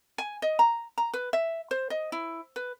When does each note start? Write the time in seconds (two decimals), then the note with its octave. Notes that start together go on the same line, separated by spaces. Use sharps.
0.18 G#5
0.42 D#5
0.59 A#5
0.98 A#5
1.14 B4
1.33 E5
1.71 C5
1.90 D#5
2.12 E4
2.56 B4